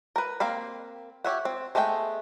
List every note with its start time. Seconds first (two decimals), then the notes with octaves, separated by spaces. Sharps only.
0.16 A#4 B4
0.40 A#3 C4 F5 B5
1.24 G4 C#5 E5 F#5
1.45 C4
1.75 G#3 A3 B3 G#4 G5